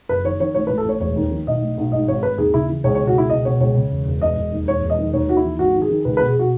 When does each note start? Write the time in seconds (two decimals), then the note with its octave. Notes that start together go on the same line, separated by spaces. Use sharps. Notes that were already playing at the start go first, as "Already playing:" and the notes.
0.09 F#1 B4
0.24 D#3 C#5
0.40 D#3 C#5
0.54 A1 C#5
0.67 B4
0.70 A1
0.78 A4
0.85 A1 C#5
1.00 E1 C#5
1.16 D#2
1.31 D#3
1.47 B1 D#5
1.61 A2
1.78 B1
1.92 G#2 D#5
2.08 G#1 C#5
2.23 G#1 B4
2.38 D#2 G#4
2.54 C#3 E4
2.69 E3
2.84 C#2 C#5
2.95 C#5
2.99 B2
3.07 F#4
3.15 C#2 E4
3.29 B2 D#5
3.45 B2 C#5
3.60 C#2 C#5
3.75 C#3
3.91 E1
4.06 E1
4.22 E1 D#5
4.37 E1
4.52 D#2
4.67 E1 C#5
4.83 E1
4.90 D#5
4.98 D#3
5.13 D#2 C#5
5.29 D#2 F#4
5.37 E4
5.43 E3
5.59 G#1 F#4
5.74 D#3
5.82 G#4
5.90 D#3
6.05 C#2 B4
6.17 B4
6.21 B2
6.28 G#4
6.36 B2 F#4